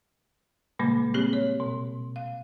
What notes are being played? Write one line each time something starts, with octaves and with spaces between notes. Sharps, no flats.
A#2 C#3 G3 G#3 A#3
A#3 C4 G4 G#4
C#5
B2
F5